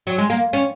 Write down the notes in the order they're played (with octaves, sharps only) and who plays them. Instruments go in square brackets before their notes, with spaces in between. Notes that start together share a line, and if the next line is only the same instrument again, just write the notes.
[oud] F#3
G#3
A#3
C#4